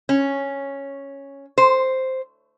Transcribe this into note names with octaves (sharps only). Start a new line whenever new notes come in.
C#4
C5